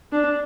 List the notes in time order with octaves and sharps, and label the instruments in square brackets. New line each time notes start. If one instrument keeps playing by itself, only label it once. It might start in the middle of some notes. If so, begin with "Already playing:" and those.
[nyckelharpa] D4